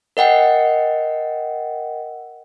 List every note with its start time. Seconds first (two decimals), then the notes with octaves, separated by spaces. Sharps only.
0.17 A#4 D#5 F#5 G5